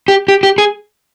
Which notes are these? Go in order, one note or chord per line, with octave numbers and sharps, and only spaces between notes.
G4
G4
G4
G#4